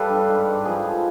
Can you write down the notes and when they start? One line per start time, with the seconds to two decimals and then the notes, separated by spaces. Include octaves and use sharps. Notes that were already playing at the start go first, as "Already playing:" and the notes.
Already playing: G3 A4 B4 F5
0.09 G2
0.28 G#2
0.47 G#2
0.65 F3 G#4
0.84 G#2